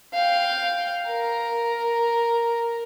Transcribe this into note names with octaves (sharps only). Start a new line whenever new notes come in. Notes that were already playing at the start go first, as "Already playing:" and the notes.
F5 G5
A#4